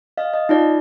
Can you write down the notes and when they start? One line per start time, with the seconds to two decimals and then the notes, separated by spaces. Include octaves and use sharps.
0.17 D#5 F5
0.33 D#5
0.49 D#4 F4 D5